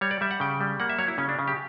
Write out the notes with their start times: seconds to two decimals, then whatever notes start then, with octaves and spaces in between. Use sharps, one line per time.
0.01 G3 C#5
0.11 D5
0.21 G3 E5
0.31 F#5
0.40 C#3 G5
0.61 G3
0.80 A#3 F#5
0.90 E5
0.98 F#3 C#5
1.08 E4
1.18 C#3 C#4
1.29 D4
1.39 C#3
1.48 G4